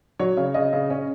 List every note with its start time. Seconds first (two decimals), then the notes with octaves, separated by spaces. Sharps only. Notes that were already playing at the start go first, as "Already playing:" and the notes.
0.19 F#3 C#5
0.37 C#3
0.54 C#3 D#5
0.73 C#3
0.90 C#4